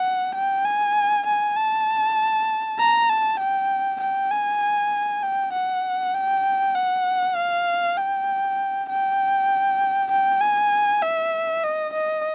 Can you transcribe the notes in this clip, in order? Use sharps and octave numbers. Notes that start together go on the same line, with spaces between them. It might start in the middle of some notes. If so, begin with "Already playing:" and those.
Already playing: F#5
G5
G#5
G#5
A5
A#5
A5
G5
G5
G#5
G5
F#5
G5
F#5
F5
G5
G5
G5
G#5
E5
D#5
D#5